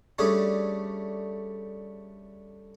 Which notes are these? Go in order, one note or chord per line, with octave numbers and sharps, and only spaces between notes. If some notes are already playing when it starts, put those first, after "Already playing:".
G3 A3 C#4 D4 G#4 A4